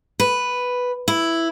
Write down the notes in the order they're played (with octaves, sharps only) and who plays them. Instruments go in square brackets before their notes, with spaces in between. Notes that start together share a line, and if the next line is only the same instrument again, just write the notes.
[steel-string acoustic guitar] B4
E4